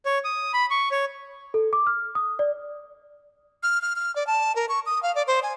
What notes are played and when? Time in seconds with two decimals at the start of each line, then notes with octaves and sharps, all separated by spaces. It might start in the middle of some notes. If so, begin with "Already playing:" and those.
0.05 C#5
0.24 D#6
0.53 B5
0.71 C#6
0.91 C#5
1.54 A4
1.73 D6
1.87 F6
2.15 D#6
2.39 D5
3.63 F6
3.82 F6
3.96 F6
4.16 D5
4.27 A5
4.56 A#4
4.69 C#6
4.86 D#6
5.03 F5
5.15 D5
5.27 C5
5.43 G#5